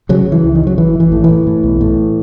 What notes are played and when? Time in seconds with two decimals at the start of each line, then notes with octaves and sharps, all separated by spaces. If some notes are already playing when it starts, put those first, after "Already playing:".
0.09 C#3 F#3
0.26 C#3
0.32 E3
0.43 C#2
0.55 D#3
0.60 C#3
0.67 F#3
0.78 A1 E3
0.95 A1
1.00 E3
1.12 A2
1.24 A2 E3
1.47 A2
1.63 B1
1.81 A2